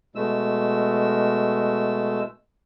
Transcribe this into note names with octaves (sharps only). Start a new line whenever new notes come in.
B2 G#3 A3 E6